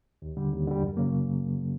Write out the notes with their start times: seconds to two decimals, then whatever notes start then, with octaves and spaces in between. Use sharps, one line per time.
0.22 D#2
0.37 D3 G3
0.52 D#2
0.67 D3 G3
0.83 F#2
0.97 C#3 F#3 A#3